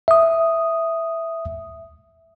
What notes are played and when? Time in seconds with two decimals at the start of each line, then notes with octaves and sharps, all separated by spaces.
0.08 E5 D#6